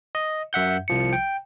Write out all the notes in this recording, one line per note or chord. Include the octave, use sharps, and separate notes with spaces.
D#5
F#2 E5 F#5 G6
C2 F3 C#7
G5